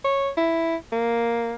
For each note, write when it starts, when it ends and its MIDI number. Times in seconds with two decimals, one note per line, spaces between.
0.04 0.30 73
0.37 0.76 64
0.92 1.54 58